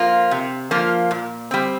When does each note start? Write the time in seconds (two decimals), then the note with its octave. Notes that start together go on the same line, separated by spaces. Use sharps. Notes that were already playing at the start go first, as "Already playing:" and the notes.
Already playing: F3 A#3 F4
0.31 C3
0.71 F3 A#3 F4
1.11 A#2
1.51 G3 C4